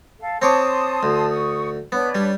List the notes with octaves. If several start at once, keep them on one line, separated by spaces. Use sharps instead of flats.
A4 F5
C4 C#5 A5 C6 D6 D#6
D2
C#6 D#6
B3 D4 B4 C#5
G3